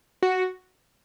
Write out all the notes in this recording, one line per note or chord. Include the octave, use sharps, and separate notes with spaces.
F#4